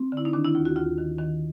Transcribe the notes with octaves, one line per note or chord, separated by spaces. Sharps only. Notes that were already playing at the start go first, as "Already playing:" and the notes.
Already playing: C4
D3
E4
D#4
D#3 D4
E4
D#2 F4
F#4
D#2 F4
D#3
D#3